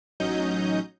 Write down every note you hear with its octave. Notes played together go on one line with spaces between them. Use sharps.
A1 F#3 C#4 D#4 D#5 G6